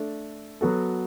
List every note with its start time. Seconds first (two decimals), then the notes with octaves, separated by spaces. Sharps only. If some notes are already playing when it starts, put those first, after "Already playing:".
Already playing: A3 D4 A4
0.61 F#3 B3 F#4 A4